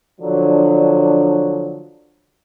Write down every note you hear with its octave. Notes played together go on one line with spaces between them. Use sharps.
D3 F3 F#3 D4